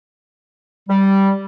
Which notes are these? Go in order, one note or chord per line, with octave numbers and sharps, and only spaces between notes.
G3